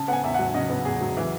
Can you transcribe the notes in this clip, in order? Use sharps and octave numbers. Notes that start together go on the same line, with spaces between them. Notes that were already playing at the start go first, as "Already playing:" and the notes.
Already playing: C#3 A5
B3 F#5 G#5
E2 E5
F#3 F#5
C#3 D#5
B3
E2 G#4
F#3
E3